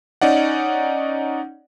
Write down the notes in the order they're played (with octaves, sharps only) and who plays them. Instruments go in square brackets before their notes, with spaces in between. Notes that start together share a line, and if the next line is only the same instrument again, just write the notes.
[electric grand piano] C#4 D#4 D5 F#5